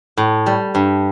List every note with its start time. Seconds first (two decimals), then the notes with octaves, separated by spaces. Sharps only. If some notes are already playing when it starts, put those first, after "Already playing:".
0.17 A2
0.46 G3
0.75 G2